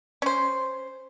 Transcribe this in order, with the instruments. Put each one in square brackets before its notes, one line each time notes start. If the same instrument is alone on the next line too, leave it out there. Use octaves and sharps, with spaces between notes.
[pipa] C#4 C5